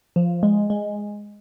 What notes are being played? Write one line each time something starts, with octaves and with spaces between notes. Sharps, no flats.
F3
G#3
G#3